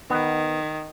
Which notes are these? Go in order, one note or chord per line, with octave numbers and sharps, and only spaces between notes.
D#3 B3